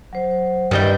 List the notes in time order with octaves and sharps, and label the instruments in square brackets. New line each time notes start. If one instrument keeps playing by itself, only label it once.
[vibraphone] F#3 C5
[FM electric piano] G2 D#5 G6 [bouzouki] D#3 G3 E4 [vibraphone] B4